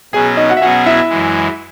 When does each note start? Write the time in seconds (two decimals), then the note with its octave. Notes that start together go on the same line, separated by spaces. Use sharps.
0.13 B2 F#3 C#4 G#4 G#5
0.37 D#4 D#5
0.49 F#4 F#5
0.57 E5
0.61 B2 F#3 C#4 F#4 G#4 F#5
0.86 E4 E5
1.09 F#2 E3 G#3